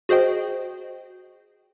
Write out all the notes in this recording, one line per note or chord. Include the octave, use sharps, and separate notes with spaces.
F#4 G#4 C5 D#5 G5